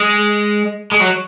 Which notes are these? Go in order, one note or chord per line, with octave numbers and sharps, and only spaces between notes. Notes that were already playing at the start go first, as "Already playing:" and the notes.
Already playing: G#3
G#3
F#3